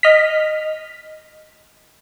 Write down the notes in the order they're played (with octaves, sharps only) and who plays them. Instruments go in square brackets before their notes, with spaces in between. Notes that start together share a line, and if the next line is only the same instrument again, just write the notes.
[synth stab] D#5 F6 B6